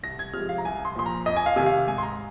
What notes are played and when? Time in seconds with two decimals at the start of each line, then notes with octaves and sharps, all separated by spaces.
0.03 C2 A#6
0.19 G#6
0.34 C3 F3 G#3 F6
0.49 F5
0.58 A#5
0.64 C2 G#5
0.85 C6
0.96 A#2 F3 C6
1.06 A#5
1.26 F2 D#5
1.36 G#5
1.46 F5
1.56 C3 D#3 G#5
1.66 F5
1.87 G#2 G#5
1.98 C6
2.03 A#5